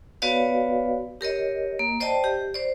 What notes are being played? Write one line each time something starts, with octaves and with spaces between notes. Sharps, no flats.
B3 F#4 B4 C#5 D5 F5
G4 A#4 C#5 D#5
A#3
C5 D5 D#5 G5 A5
G4
C5 D5